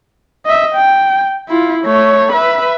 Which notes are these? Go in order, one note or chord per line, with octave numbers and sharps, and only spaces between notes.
D#5 E5
G5
E4 F4
A3 C#5
B4 E5